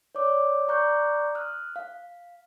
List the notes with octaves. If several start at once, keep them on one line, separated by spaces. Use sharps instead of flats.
C#5 D5 D6
D5 A#5 C#6 D6 F#6 G6
D#6 F6 F#6
F5